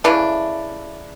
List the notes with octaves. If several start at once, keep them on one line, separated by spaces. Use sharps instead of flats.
C#3 E3 A3 D4